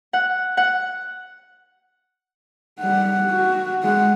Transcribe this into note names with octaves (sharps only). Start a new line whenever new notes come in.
F#5
F#5
G3 F#5
F#4
G#3 F#5